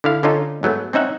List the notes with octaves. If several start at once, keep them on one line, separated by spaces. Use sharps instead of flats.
D3 E4 F5
D3 C#4 D#4 F4 A4
G#2 F#3 A3 B3
C4 C#4 D#4 E5 F#5